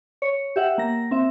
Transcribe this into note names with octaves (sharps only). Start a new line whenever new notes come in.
C#5
G4 E5 F#5
A#3 A#6
C4 E5